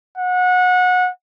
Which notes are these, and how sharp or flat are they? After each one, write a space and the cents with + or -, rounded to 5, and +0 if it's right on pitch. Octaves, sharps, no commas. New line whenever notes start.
F#5 -25